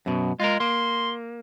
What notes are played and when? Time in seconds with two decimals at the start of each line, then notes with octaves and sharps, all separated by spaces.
0.06 F#2 B2
0.40 G#3 F4 A#4
0.60 A#3 C6